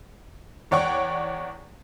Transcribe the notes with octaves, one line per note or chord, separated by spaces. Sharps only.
E2 C#5 D5 F#5 G5 C#6